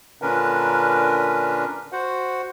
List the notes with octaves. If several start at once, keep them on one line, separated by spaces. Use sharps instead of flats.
A#2 D3 C#4 D4 A#4 B4
F#4 C5 F#5